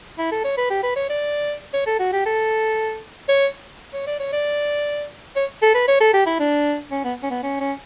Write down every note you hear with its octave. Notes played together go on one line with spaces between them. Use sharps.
E4
A4
C#5
B4
G4
B4
C#5
D5
C#5
A4
F#4
G4
A4
C#5
C#5
D5
C#5
D5
C#5
A4
B4
C#5
A4
G4
E4
D4
C#4
B3
C#4
B3
C#4
C#4